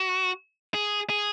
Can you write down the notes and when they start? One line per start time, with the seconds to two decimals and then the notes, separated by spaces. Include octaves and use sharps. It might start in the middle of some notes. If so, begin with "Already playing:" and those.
Already playing: F#4
0.74 G#4
1.10 G#4